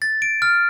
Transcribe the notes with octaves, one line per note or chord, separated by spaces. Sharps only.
A6
D7
F6